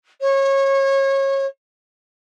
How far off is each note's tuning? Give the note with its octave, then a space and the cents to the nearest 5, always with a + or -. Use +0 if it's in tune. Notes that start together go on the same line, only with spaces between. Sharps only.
C#5 -25